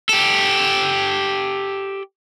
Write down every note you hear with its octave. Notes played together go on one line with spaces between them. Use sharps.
G4 A4